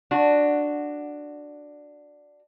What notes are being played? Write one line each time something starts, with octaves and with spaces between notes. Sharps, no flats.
D4 F#4